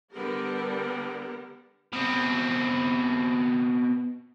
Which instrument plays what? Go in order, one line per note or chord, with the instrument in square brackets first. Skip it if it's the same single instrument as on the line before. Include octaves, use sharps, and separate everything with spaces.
[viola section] D3 G3 B3 G4 A#4
[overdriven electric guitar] B2 C4